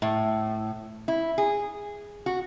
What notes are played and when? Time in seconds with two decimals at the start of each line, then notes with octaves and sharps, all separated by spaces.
0.02 A2
1.08 E4
1.38 G#4
2.26 F#4